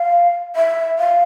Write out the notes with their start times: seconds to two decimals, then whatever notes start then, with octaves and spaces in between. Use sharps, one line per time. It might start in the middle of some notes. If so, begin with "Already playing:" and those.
Already playing: F5
0.56 E5
0.99 F5